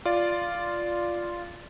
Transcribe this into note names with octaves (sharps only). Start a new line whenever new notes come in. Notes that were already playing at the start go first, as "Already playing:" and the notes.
F4 D5